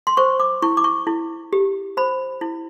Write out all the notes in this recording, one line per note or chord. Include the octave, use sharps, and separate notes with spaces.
C6
C5 C#6
D6
E4 C#6
D6
C#6
E4
G4
C5 B5
E4